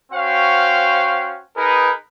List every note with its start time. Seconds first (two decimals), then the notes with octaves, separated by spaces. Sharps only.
0.13 C#4 F#4 C5 F5 G5
1.57 D#4 G#4 A#4 B4